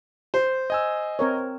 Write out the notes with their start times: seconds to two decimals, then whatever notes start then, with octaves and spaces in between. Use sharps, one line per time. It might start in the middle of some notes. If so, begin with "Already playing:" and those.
0.34 C5
0.70 D#5 G#5 E6
1.19 C4 A#4 C#5